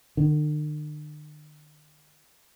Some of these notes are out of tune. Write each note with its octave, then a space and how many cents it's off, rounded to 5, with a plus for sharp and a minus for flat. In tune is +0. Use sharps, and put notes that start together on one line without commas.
D3 +45